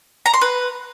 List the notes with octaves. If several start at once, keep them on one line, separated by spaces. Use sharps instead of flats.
A#5
C6
B4